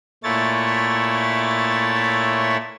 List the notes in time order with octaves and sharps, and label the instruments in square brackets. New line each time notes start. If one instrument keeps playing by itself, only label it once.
[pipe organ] A#2 A3 E4 C#5 A6